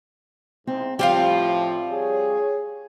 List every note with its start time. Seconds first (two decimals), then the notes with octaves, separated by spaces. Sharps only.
0.67 G#2 C4 E4
0.99 A2 F3 G3 C4 F4 G4
1.92 G#4 C#5